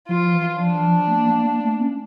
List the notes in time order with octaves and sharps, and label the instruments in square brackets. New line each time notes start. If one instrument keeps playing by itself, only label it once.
[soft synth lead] F3 [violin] F4
[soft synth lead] E3
[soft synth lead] F3 [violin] D4
[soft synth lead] E3
F3
A3
A#3
A#3
A#3
A#3
A3
A#3
C#4